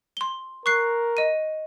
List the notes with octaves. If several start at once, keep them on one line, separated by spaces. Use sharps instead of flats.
C6 G7
A#4 C#6 F#6 C7
D#5 D#7